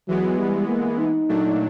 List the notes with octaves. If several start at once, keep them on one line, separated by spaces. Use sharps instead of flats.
E3 F#3 G#3 B3
G3
A#3
D#4
A#2 F#3 A3 D4